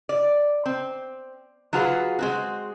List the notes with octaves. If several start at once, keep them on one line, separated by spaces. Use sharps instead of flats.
D5
C4
F#3 F4 F#4 G#4 B4
G#3 C4 F#4